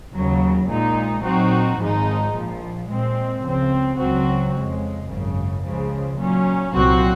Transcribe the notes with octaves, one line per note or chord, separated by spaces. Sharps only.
D#2 C#3 F#3
A#1 A#2 G#3 D#4
A#2 F#3 C4 D#4 F#4
G#1 G#2 F3 G#3 D#4
A#1 A#2 F3
A#2 G#3 C4
C#2 C#3 F3 C4
C#2 C#3 F#3 C4 F#4
F2 C#3 G#3
G#1 F#2 C#3
C#2 C#3 F3 G#3
A#2 F#3 C#4
C2 A#2 F#3 C4 F#4